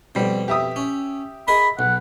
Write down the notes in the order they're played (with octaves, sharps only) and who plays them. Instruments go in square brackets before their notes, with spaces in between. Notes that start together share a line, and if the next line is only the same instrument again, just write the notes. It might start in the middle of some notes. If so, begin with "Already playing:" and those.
[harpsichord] F2 B2 [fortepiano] G3 C4
[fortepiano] G4 E5 D#6
[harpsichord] C#4
[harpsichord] G#4 A#4 D#5 [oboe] B5
[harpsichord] B1 [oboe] F#5